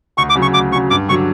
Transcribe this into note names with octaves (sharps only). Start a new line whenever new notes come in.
D2 C#6
D6
C#3 F#3
C#6
D2 D6
C#3 F#3 C#6
G2 D6
D3 F#3 C#6